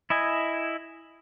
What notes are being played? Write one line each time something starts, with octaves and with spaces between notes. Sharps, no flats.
E4 D#5 G#5